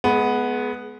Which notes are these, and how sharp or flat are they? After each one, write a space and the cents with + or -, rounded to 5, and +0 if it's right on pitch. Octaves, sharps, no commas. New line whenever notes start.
G#3 +30 B3 +0